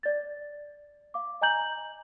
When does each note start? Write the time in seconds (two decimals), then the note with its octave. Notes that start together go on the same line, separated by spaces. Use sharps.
0.03 D5 A6
1.14 F5 D6
1.41 D#5 G#5 A#5 G6 F#7